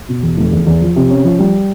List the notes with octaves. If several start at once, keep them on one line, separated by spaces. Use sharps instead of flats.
B2
E2
F1
E2
E2
F3
C3
C#4
F3
G3